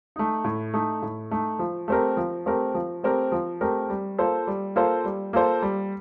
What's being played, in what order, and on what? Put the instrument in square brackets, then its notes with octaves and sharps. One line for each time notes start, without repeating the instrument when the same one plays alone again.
[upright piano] A3 D#4
A2
A3 D#4
A2
A3 D#4
F3
A3 C4 G4 A#4
F3
A3 C4 G4 A#4
F3
A3 C4 G4 A#4
F3
A3 C4 G4 A#4
G3
A#3 F4 A4 C5
G3
A#3 F4 A4 C5
G3
A#3 F4 A4 C5
G3